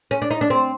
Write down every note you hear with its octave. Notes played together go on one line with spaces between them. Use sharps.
C#4
D4
D#4
D4
C4